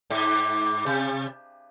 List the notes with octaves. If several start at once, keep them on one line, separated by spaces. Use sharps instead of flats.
G#2
C3